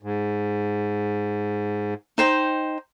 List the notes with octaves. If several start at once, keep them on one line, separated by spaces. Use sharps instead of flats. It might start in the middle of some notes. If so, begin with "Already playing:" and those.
G#2
D#4 C5 G5